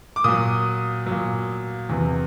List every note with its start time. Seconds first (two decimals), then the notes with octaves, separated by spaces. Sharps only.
0.16 D6
0.24 A#2 F#3 D#6
1.06 A#2 F#3
1.89 E2 C3 E3